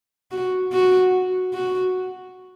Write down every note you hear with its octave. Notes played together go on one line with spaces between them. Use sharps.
F#4
F#4
F#4